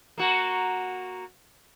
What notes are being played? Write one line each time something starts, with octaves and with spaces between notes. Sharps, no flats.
A#3 F#4